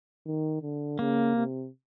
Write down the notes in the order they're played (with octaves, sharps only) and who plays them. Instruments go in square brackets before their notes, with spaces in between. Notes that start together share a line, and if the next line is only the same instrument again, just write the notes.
[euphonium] D#3
D3
[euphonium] C#3 [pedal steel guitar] A#3
[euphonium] C3